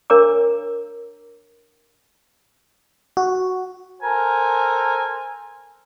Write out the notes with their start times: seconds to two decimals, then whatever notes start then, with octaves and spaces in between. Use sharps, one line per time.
0.10 D4 A#4 C#5 A#5 D6
3.17 F#4
4.03 A4 A#4 C5 G#5